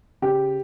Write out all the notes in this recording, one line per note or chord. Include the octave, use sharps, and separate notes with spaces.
C#3 G4